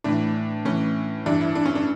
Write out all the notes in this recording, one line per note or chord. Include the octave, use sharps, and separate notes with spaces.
A2 E3 D4
A2 E3 C#4
G2 E3 D4
E4
D4
C#4
D4